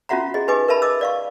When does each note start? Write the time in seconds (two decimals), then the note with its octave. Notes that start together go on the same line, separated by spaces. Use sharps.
0.09 C#4 F4 F#4 E5 F#5 A#5
0.34 G#4 D#5
0.48 D#4 G4 B4 D#5 G#5 D6
0.68 A#4 B4 E5 A5 B5
0.82 D#5 D6 E6
1.01 D5 F5 C#6